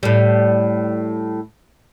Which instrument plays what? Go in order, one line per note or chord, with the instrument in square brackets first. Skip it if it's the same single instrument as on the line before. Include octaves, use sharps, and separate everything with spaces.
[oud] A2 G3